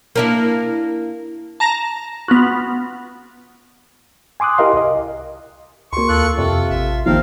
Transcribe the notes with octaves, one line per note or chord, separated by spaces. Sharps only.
A#3 D4 E4
A5 A#5 A#6
B3 F4 F#4
G#5 C6 D6 D#6 F#6
E4 G4 A#4 D#5 F5 C6
C2 D#5
C#2 A#3 C6 C#6
D#2 F4 A4 F#6
F2 C3 F4 A4
A1 E5
A1 D#2 D#3 F3 C4 A#4 F5